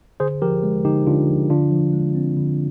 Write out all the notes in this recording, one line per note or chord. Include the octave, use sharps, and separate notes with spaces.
D3 G#4 C5
F3 G4 A#4
G#3
D3 D#4 G4
D3 D4 F4
F3
D3 D4 F4
F3
G#3
C4
D3